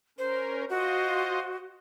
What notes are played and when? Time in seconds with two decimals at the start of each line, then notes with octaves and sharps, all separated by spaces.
0.18 C#4 A#4 C5
0.70 F4 F#4 C5 D#5